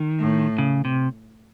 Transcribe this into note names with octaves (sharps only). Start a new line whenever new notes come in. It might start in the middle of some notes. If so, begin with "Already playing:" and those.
Already playing: D#3
A2
C#3
C3